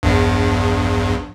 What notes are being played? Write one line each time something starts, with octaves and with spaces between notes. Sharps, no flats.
A#1 E2 G2